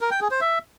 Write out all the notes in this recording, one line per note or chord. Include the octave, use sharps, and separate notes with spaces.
A#4
G5
G#4
C5
E5